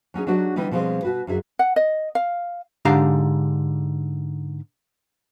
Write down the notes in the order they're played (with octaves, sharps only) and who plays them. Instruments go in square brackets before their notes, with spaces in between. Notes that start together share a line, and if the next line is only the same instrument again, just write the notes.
[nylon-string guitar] F#3 C#4 D#4 G#4
F#3 G#3 D4 D#4 F#4 G4
D3 E3 G3 B3 D#4 E4
B2 F3 G3 G#3 C4
B2 F#4 B4
F#2 D3 F#4 G#4 E5
[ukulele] F#5
D#5
F5
[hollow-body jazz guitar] G#2 D3 G4 F5 A#5